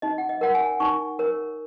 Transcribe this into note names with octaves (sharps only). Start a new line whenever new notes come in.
D#4 D#5
F#5
D#5
A#4 C#5 F#5
G#5
D#4 C#6
A#4 C#5